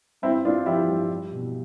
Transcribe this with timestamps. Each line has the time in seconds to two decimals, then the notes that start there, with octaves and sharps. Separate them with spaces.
0.22 G2 C4 E4
0.44 G2 D4 F4
0.66 F3 E4 G4
0.88 G2
1.10 G3
1.32 B2